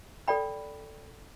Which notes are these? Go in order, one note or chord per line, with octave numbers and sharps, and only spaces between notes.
A4 D5 G5 B5